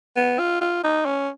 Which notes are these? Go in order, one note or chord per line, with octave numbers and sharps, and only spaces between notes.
B3
F4
F4
D#4
C#4